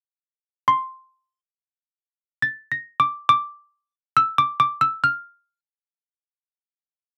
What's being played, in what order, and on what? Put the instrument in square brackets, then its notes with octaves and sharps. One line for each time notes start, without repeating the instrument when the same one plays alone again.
[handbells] C6
A6
A#6
D6
D6
E6
D6
D6
E6
F6